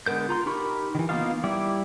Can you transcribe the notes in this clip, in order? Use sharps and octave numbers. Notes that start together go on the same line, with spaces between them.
D3 G#3 B3 A#4 G6
F4 A#5 C6
D#4 G4 A#4 B5 C#6
D#3 E3
A#3 B3 D#4 F4 F5
G3 E4 D5